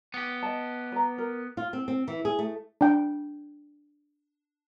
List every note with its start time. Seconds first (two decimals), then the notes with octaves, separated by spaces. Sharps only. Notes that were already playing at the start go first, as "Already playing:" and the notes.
0.14 B3 G4
0.43 D#5 A5
0.92 B4 A#5
1.18 A#4
1.57 F4
1.73 C4
1.88 C4
2.08 E3
2.25 G#4
2.39 A3
2.81 D4 G5